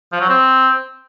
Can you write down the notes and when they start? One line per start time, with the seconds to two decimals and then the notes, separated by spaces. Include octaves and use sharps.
0.12 F3
0.21 F#3
0.29 C4